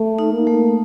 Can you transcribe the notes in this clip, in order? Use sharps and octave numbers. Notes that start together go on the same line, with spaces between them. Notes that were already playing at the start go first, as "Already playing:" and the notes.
Already playing: A3
D#4
A#3
A3